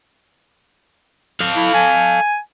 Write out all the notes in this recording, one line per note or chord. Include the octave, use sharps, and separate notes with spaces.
A4 F5
E4
G#5